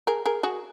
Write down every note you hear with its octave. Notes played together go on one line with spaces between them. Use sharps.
G#4 A#4
G#4 A#4
F#4 G#4